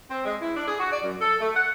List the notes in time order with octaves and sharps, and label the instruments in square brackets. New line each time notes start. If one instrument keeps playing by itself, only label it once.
[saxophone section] C4
G#3
E4
D4
G#4
F#4
D5
F#2
A4
A3
F#5